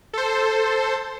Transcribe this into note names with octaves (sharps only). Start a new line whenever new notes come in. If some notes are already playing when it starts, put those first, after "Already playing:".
A4 C5